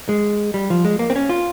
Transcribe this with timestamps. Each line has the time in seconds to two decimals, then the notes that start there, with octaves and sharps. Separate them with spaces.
0.09 G#3
0.54 G3
0.70 F3
0.85 G#3
0.99 A#3
1.10 C4
1.16 C#4
1.29 F4